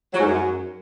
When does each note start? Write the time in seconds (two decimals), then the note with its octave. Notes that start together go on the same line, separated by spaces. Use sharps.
0.13 F#3
0.19 G#2
0.25 F#2